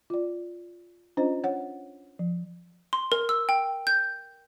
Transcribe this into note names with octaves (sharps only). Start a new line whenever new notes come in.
F4 D5
C#4 D4 F4 C5 D#5
C#5 F#5
F3
C6
A#4
E6
G5
G6